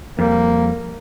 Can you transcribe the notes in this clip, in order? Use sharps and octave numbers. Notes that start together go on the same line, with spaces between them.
F2 G3 A#3